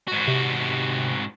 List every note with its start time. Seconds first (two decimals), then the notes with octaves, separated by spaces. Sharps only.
0.08 G#2 F#4
0.28 C3